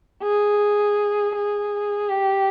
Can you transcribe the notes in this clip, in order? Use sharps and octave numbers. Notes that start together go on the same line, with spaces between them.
G#4
G#4
G4